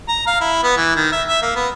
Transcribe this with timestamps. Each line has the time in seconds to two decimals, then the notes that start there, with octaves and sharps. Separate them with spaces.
0.08 A#5
0.27 F5
0.40 E4
0.63 B3
0.77 E3
0.96 D#3
1.12 E5
1.28 E5
1.42 A#3
1.56 B3